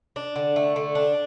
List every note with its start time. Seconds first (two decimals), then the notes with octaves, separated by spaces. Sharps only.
0.16 D4
0.36 D3
0.56 A3
0.76 D3
0.95 D4